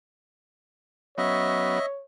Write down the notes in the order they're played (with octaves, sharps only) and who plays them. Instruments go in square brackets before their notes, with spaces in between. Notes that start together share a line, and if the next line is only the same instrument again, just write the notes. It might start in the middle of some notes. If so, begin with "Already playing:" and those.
[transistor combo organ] F#3 B3 C#4 [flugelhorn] C#5 [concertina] D#5 E5